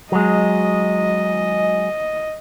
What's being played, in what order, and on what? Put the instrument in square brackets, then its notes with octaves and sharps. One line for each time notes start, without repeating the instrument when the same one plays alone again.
[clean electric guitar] F#3 G#3 [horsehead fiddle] D#5